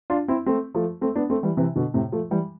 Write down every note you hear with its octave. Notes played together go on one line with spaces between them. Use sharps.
D4 F4
C4 E4
A3 C4
F3 A3
A3 C4
B3 D4
A3 C4
E3 G3
C3 E3
B2 D3
A2 C3
F3 A3
E3 G3